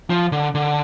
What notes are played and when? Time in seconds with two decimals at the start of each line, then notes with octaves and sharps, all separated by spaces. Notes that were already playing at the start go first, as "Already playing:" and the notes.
0.10 F3
0.32 D3
0.55 D3